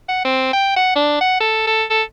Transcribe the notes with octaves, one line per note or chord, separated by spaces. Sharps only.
F#5
C4
G5
F#5
D4
F#5
A4
A4
A4